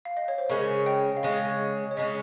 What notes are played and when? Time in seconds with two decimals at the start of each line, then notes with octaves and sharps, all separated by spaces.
0.05 F5
0.17 D#5
0.28 C#5
0.38 C5
0.50 C#3 G#3 C#4 A#4
0.86 D#5 G5
1.17 F5
1.23 C#3 G#3 C#4 D#5
1.91 C#5
1.97 C#3 G#3 C#4 D#5